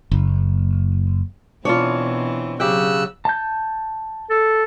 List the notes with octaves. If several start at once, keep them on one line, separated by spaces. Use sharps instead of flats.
F#1
B2 E3 C4 D4 F4 C#5
C#3 F#3 G4 G5 E6 F#6
A5 G6
A4